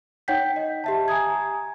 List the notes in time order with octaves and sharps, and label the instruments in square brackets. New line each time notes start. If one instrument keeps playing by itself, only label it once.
[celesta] D#4 C#5 F#5 G5 G6 B6
D#5
G4 E5 A5
G#5 A#5 D#6 G#6